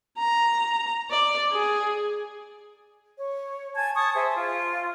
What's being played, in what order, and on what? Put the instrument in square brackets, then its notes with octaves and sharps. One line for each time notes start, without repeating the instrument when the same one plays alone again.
[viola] A#5
D5
G#4
[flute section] C#5
G#5 A5 G#6
A5 C#6 D#6
G#4 C5 E5
F4